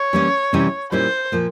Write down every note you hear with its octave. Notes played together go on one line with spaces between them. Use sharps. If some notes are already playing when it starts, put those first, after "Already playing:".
Already playing: C#5
E3 G3 A#3 C#4
C3 E3 G3 C#4
A#2 G3 C#4 E4 C5
A#2 F3 A#3